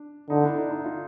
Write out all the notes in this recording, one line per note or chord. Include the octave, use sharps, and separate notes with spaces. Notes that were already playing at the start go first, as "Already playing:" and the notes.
Already playing: D4
D3 D#4
D4 E4
D#4
D#4
D#4 F4